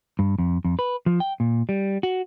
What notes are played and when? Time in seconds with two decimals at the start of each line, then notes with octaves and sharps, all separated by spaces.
0.19 G2
0.39 F2
0.65 F2
0.79 B4
1.06 F3
1.20 G5
1.40 A#2
1.69 G3
2.03 F#4